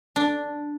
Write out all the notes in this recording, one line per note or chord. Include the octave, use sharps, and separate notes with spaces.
D4